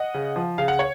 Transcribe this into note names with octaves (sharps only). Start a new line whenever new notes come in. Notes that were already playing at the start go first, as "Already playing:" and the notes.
Already playing: D#5 F#5
C#3
F3
C#3 F5
F#5
C#5